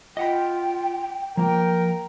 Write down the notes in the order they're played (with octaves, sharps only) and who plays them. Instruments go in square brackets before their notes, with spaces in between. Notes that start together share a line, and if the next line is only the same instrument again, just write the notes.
[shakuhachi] F4 [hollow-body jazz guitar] D#5 F#5 B5 [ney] G5
[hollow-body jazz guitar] F3 A#3 [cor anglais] A#4 [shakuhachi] G5